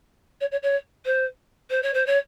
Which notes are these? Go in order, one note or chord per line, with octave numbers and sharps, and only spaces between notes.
C#5
C#5
C#5
C5
C5
C#5
C5
C#5